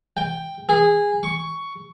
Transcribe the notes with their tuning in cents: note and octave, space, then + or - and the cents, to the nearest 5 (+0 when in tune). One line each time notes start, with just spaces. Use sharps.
G5 +5
G#4 -15
C#6 +10